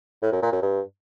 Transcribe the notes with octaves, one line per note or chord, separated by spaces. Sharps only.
A2
F#2
A#2
F#2
G2